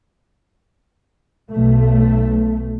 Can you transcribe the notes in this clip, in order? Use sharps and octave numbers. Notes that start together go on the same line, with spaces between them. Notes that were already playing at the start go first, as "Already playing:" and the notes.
B1 A3